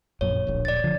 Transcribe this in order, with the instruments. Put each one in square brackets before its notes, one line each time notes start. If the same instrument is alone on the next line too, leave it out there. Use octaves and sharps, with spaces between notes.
[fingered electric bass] A#1 F#2 A#2 [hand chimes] C#5
[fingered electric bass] D1 A#1
[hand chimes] D5 A6
[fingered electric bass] D3 F3